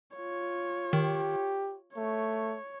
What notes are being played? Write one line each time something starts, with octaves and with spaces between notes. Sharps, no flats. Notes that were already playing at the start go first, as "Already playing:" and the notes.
F4 C#5
D#3 G4
A3 C#5